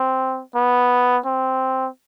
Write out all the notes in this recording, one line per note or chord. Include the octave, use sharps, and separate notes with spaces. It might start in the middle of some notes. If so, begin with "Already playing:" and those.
Already playing: C4
B3
C4